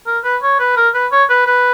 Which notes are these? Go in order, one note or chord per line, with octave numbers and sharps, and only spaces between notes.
A#4
B4
C#5
B4
A#4
B4
C#5
B4
B4